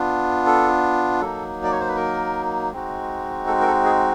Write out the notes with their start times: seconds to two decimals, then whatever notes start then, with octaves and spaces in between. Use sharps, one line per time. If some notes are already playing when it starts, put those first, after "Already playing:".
Already playing: B3 D4 F4
0.46 A4
1.21 F#3 A#3 D#4 A4
1.64 D5
1.72 C#5
1.80 C5
1.88 B4
1.96 A#4
2.72 G#3 C4 D#4 F#4
3.47 A4
3.61 A#4
3.67 A4
3.85 G#4